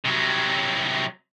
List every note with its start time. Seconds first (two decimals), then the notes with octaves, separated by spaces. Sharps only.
0.05 C3 F#3